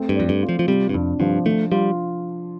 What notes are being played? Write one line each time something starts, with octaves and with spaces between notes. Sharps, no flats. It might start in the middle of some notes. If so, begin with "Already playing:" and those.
Already playing: A3 C4
G2
F2 D5
G2
F4
F3
F3
C3 G3
G2
F2 D4
G2 F3
F3 A3
G3 F4